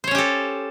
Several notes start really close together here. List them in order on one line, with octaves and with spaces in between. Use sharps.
C5 C#5 C#4 G4 A4